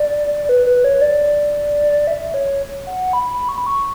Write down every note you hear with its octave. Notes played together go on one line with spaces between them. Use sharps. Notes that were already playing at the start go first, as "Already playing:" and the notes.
Already playing: D5
B4
B4
C#5
D5
E5
C#5
F#5
B5
B5
C#6
B5
C#6